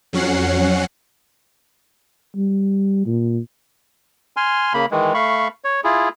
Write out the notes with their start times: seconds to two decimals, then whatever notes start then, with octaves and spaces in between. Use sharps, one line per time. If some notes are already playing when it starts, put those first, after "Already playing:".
0.13 F2 F#3 C#4 F#5 C7
2.36 G3
3.06 A#2
4.37 G#5 C6 F6
4.74 C#3 A#3 B5
4.91 D#3 E3 G#3
5.14 A3 F5 B5 C#6
5.64 C#5
5.84 E4 F4 G#4